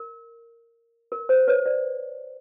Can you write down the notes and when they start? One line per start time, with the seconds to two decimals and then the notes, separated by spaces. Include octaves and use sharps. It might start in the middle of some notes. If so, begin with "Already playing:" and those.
Already playing: A#4
1.12 A#4
1.29 C5
1.48 B4 C#5
1.66 C5 D5